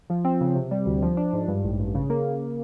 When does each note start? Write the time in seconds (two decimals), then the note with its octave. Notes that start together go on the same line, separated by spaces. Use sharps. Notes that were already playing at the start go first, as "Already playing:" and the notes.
0.10 F3
0.25 C4
0.41 C#3
0.55 C3
0.71 G3
0.86 D2
1.02 F3
1.17 D4
1.33 G#2
1.48 G2
1.63 A1
1.79 A1
1.95 C#3
2.10 A#3